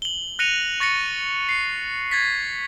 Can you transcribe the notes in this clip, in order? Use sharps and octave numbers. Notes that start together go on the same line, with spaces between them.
F#7 G7
F#6 A#6 C#7 D#7 F7
C#6 A6 A#6 C#7
C7
G#6 A6 B6